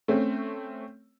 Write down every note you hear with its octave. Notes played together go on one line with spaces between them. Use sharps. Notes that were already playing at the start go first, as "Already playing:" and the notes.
A3 C4 C#4